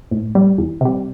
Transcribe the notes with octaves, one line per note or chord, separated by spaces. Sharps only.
A2
G3
E2
C3 G3